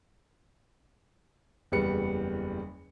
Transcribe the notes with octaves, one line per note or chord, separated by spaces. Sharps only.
F#1 E2 G3 B4 C#7